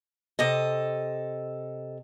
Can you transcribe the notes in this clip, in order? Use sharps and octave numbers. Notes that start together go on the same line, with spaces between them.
C3 A4 D#5